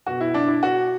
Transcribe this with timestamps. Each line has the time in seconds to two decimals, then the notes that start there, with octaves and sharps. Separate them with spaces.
0.06 B2 F#4
0.20 E4
0.34 D4
0.48 E4
0.63 F#4